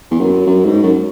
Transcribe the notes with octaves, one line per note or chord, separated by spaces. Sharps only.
E2
F#2
F#2
G#2
F#2